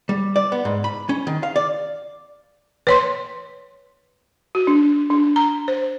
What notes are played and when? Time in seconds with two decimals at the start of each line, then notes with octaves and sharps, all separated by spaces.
0.09 G3
0.36 D5
0.52 B3
0.65 G#2
0.84 B5
1.09 C#4
1.27 D#3
1.43 F5
1.56 D5
2.87 B4 C#5 C6
4.55 F#4
4.67 D4
5.10 D4
5.36 A#5
5.68 C5